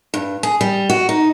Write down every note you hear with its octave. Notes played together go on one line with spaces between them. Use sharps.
G2
G#4
G3
F#4
D#4